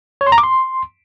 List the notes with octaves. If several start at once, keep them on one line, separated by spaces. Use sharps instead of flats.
C#5
C6
A#5
D6
C6